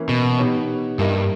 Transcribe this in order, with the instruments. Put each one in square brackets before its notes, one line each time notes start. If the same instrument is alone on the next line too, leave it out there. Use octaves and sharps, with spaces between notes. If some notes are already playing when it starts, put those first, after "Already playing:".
Already playing: [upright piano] E3 A#3 C#4 E4
[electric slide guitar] B2
[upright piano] B3 D#4 G4 C#5
[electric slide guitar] G2 [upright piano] A#3 E4 A#4 D#5